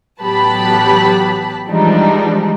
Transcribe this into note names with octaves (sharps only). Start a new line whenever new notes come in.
A1 F#3 B3 G4 A5 B5
E3 F3 G3 G#3 D4 D#4